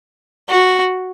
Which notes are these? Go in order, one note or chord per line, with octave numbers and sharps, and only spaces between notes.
F#4